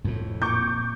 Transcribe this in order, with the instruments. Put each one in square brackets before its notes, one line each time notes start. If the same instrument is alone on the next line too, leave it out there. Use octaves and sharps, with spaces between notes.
[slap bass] F2 A2
[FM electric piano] A#2 [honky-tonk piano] C#6 D6 G6